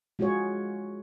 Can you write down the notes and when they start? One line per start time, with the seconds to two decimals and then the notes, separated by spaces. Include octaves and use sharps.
0.19 G#3 F4 F#4 G#4 C#5